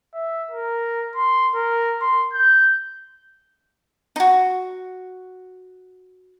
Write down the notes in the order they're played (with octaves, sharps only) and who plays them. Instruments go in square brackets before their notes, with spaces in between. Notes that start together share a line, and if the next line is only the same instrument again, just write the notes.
[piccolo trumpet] E5
A#4
C6
A#4
C6
G6
[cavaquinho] D#4 F#4